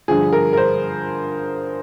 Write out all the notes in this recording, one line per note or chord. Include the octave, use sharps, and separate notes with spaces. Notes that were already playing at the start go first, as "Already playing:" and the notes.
G2 D3 F3 G#4
A#4
A#4
C5